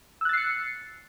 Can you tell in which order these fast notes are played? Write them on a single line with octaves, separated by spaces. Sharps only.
E6 F#6 A6 C7 C#7